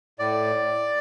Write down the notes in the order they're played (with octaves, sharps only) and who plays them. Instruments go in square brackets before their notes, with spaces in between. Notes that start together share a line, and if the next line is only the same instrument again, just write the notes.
[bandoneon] A2 D5